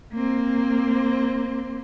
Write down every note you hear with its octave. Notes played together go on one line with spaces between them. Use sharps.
A#3 C4